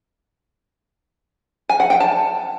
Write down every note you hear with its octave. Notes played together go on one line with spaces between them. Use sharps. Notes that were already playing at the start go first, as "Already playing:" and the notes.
G#5
F#5
G5
A5